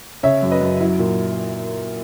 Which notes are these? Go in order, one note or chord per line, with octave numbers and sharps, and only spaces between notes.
C#3 C#5 E5
F#2
B4 D#5
F#2
F#3 E4
A#2